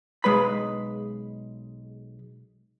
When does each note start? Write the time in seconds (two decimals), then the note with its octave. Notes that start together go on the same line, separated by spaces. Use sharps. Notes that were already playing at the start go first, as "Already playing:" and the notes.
0.24 B1 G#3 B4 B5